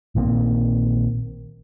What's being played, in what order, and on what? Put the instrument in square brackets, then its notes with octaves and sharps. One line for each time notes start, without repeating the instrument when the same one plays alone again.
[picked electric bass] A#1 D#3 A#3 C4